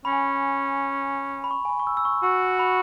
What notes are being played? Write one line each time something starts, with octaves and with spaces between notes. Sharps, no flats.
C#4 B5
G#5
B5
B5
C#6
G#5
B5
C#6
E6
E6
C#6
F#4 E6
B5